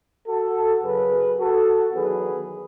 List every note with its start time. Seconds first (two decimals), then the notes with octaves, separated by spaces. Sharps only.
0.28 F#4 A4
0.83 F#2 C#3 F#3 G#4 B4
1.39 F#4 A4
1.93 E2 D#3 F#3 G#4 B4